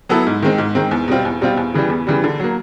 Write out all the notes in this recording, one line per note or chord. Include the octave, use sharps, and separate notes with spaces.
F#3 B3 E4 A4
G#2
D#3 G#3 C4
G#2
D#3 G#3 C4
E2
B2 G3 C4 F4
E2
B2 G3 C4 F4
E2
C#3 E3 G3
E2
C#3 E3 G3
D3
F#3 A#3